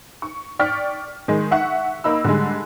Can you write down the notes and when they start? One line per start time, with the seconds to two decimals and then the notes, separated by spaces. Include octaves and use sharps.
0.22 C#6
0.59 D5 G5 C#6 F6 B6
1.28 D#3 G#3
1.51 E5 F#5 C#6
2.04 A#3 D#4 B5 E6
2.25 D3 G3 G#3